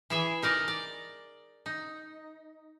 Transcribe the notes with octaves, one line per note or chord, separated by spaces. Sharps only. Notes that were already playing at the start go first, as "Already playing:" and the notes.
E3 E4 G#4 E5
D#4 A#4 D5 D#5
D5
D#4